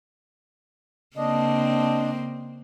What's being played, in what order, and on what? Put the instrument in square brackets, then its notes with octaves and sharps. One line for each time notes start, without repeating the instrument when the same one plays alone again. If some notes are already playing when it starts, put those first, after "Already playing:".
[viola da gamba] C#3 A#3 C4 [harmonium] D4 D#5